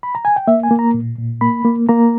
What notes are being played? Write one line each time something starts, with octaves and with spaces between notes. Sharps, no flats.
B5
A#5
G#5
G5
A#3 E5
G#5
A#3
A#5
A#2
A#2
A#3 B5
A#3
A#3 A#5